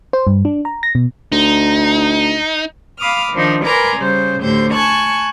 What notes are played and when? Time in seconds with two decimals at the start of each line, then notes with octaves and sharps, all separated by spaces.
0.13 C5
0.27 G2
0.45 D4
0.65 A#5
0.83 A#6
0.95 B2
1.32 D2 D#4
2.99 F5 B5 D6 D#6 F6
3.33 D#3 F3 D4 D#4
3.64 A#4 B4 D5 G#5 A#5 C6
3.97 C#3 G3 C5
4.42 D2 A2 D3 G4 C5 G6
4.72 G#5 A5 C#6 F#6 G#6